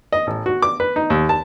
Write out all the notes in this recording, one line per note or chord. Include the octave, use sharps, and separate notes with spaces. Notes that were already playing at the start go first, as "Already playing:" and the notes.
D#5
A1
F#4
D6
B4
D#4
D#2
A5